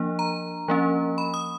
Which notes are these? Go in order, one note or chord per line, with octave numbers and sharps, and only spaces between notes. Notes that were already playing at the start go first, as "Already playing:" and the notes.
Already playing: F3 A#3 D4
A#5
F3 A#3 C#4
B5
D#6